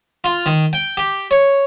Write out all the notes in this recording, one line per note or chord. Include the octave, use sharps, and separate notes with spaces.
F4
D#3
G5
G4
C#5